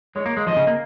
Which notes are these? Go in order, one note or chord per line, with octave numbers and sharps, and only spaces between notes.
G#3 C#5
A#3
G#3
F3 D#5
C#3
A#3